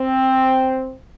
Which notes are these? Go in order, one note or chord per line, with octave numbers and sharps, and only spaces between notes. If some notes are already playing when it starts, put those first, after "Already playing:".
Already playing: C4